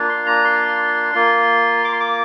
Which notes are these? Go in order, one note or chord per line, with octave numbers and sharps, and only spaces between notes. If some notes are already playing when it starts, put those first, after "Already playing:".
Already playing: A#3 D4 F4
C6
A#5
C6
A#3 F4
D6
C6
D6